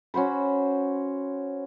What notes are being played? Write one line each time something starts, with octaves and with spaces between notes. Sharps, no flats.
C#4 F#4 C5 B5